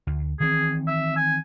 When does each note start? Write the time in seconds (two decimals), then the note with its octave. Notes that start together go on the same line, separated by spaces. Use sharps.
0.07 D2
0.40 D#3 E3 C4 G#4
0.87 E5
1.17 G#5